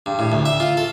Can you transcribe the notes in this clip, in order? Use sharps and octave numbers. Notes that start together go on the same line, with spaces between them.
G2
A2
D2
E5
F4
A4